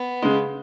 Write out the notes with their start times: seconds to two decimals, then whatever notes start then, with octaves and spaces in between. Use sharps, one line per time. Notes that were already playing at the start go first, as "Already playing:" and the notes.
Already playing: B3
0.22 C#3 G#3